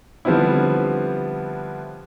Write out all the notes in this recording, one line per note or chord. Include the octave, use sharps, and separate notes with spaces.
D3 F3 G3 B3 C4 E4